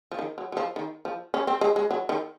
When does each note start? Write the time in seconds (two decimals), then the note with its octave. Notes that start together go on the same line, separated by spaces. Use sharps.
0.12 F3
0.19 D#3
0.38 F#3
0.52 F#3
0.57 F3
0.76 D#3
1.05 F3
1.34 C#4
1.47 C4
1.61 G#3
1.76 G#3
1.91 F#3
2.09 D#3